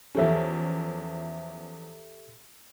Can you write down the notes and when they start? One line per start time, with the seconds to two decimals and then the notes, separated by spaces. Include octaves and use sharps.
0.15 E2 F3 C#4 G4 A4 E5